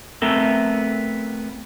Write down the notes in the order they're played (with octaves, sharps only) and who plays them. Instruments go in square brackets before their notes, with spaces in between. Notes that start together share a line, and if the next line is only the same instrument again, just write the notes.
[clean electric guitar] A3 B3 C4 A4 A#4